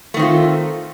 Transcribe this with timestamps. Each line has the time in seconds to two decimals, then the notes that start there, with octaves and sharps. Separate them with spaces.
0.14 A3
0.17 D#3
0.19 C4
0.22 F4